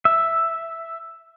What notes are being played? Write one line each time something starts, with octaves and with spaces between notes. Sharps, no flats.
E5